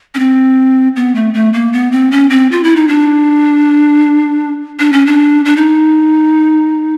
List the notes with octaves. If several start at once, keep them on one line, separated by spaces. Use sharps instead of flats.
C#4
C4
B3
A3
A3
A#3
B3
C4
C#4
C4
F4
E4
D#4
D4
D4
C#4
D4
D4
D#4